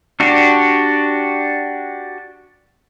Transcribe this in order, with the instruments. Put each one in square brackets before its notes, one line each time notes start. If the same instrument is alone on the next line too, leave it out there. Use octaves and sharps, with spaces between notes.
[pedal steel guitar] D4 F#4 G4